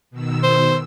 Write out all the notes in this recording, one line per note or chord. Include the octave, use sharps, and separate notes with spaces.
B2 D#3 E6
C5